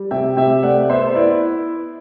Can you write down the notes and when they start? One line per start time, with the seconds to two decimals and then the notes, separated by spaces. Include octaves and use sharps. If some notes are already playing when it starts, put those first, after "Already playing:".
Already playing: G3
0.11 C3 E5 G5
0.37 C3 E5 G5
0.63 A3 D5 F#5
0.90 B3 C5 E5
1.07 C5
1.15 E4 B4 D5